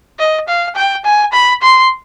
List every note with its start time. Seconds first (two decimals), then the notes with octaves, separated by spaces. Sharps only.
0.19 D#5
0.48 F5
0.76 G5
1.05 G#5
1.33 B5
1.62 C6